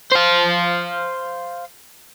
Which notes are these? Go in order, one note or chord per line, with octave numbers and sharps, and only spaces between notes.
C5 F5